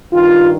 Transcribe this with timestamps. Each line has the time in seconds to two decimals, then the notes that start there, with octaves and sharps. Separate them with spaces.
0.11 G2 D#3 F4